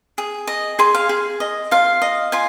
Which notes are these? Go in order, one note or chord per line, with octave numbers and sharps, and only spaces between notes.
G#4
D#5
G#4 C6
F5
G#4
D#5
F4 F5
D#5
F4 G#5